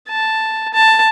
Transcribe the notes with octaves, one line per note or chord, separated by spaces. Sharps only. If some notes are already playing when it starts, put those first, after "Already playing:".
A5
A5